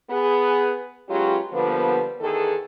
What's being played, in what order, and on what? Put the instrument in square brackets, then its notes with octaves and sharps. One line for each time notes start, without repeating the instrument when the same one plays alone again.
[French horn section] B3 G#4
F#3 G#3 B3 C#4 F4 G4
D3 F3 G3 A#3 B3
E2 D#3 G#4 A4